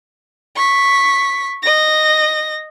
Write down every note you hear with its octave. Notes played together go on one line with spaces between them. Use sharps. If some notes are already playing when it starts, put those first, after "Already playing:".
C#6 B6
D#5 A#6